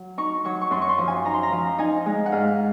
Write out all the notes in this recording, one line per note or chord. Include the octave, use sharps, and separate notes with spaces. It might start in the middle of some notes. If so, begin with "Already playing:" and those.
Already playing: F#3
D#4 C#6
F#3 C#6
C#6
F#2 C6
C#6
C6
F3
G#5
D#4 A#5
C6
A#5
F3
D#4 G#5
G#3
F#5
G#2 F5